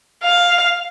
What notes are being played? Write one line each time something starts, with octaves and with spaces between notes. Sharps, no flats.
F5